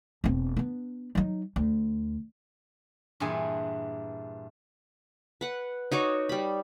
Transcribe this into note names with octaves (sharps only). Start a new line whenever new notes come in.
E1 C4
B3 D4
F#3 D#4
D2
G2 A#2 E3 G#4 G#5
B4 F#5
D#4 F#4 C#5 D6
G3 B5